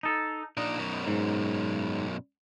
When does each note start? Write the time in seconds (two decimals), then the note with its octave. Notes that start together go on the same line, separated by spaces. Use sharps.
0.03 D#4 A4
0.57 A#2 D4 D#4
0.78 F#2 B2
1.07 G#2